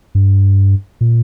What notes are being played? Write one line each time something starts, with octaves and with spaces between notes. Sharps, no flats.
G2
A#2